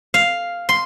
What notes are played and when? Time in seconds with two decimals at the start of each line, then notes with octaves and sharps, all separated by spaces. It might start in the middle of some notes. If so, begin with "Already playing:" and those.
0.14 F5
0.69 C6